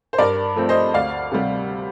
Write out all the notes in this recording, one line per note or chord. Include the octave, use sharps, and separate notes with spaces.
C5
G2 A#4 D5
F3 A3 C4
C5 D#5
D2 D5 F5
C3 G3